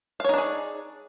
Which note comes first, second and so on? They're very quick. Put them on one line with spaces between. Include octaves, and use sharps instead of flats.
F5 C#5 D#4 D4 G#4